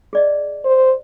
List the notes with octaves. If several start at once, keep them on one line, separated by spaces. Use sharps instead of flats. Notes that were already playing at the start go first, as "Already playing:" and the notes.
G#4 D5 D#5
C5